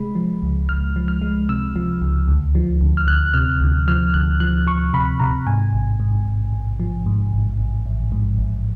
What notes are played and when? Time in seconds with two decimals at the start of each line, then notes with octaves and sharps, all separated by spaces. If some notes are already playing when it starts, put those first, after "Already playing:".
Already playing: C3 G#3 B5
0.15 F3
0.42 C#2
0.69 C#2 F6
0.96 F3
1.08 F6
1.22 G#3
1.49 C3 E6
1.76 F3
2.01 C#2
2.28 D2
2.55 F3
2.81 D2
2.97 F6
3.07 D2 F#6
3.34 C3 F6
3.61 D2
3.88 F3 F6
4.14 D2 F#6
4.40 F3 F#6
4.67 F3 C#6
4.93 C3 B5
5.19 C3 A#5
5.47 G#2 G#5
5.73 A1
6.00 G#2
6.25 A1
6.53 A1
6.80 F3
7.06 G#2
7.33 A1
7.59 A1
7.86 A1
8.12 G#2
8.38 A1